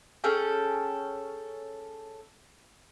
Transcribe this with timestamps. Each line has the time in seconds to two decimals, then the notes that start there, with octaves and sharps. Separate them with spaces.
0.24 C#4 G#4 A4 G5